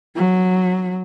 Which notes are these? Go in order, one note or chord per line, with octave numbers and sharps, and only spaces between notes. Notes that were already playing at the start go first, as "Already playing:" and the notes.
F#3